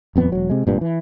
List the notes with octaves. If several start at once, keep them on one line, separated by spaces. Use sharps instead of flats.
D#1 F2 B3
E1 F#3
C3 G#3
G#1 G2 A#2
E3